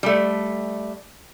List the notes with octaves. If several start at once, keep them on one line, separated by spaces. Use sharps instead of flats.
G3 A3